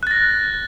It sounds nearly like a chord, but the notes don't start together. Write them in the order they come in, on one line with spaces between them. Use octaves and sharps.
F#6 A6 A#6